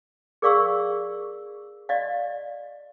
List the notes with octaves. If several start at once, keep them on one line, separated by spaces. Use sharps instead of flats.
G#4 A#4 D5 F5 C#6 E6
D5 D#5 F5